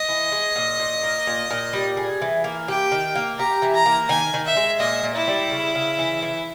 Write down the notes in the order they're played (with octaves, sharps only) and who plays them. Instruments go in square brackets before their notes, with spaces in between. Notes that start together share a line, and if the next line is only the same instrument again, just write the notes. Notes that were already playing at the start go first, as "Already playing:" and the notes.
Already playing: [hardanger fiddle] D#5
[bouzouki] E3
G#3
A#2
A#2
A#3
A#2
A#2
G3
G#4
E3
A#3
[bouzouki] G4 [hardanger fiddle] G5
[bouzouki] D#3
A#3
[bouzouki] G4 [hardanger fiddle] A#5
[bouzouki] E3
[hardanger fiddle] A#5
[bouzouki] A#3
[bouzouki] D#3 [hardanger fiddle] G#5
[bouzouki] D#3
[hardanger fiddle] E5
[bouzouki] G#3
[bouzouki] A#2 [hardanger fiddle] D#5
[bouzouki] A#2
[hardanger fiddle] E4
[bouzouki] G3
C#3
C#3
E3
E3